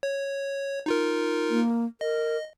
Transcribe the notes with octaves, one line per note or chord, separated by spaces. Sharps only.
C#5
D#4 F4 A#4
A#3
A#4 D#5